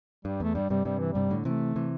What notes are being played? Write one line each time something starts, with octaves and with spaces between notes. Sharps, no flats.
G2 G3
E2 A3
G2 G3
G2 C3 G3
G2 C3 G3
E3
G2 C3 G3
A2 D3
C3 E3 A3
C3 E3